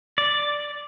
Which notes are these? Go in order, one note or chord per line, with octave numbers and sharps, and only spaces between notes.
D5